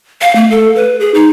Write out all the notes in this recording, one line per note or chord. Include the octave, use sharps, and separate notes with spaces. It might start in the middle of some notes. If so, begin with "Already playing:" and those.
F5
A3
A4
B4
G#4
D#4